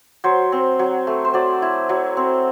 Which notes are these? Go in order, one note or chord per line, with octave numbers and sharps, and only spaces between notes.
F#3 C5
C4
F#3
A3
C5
F#3 D5
E4
F#3
C4